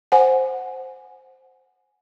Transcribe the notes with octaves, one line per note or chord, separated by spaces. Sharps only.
C5 F#5 G#5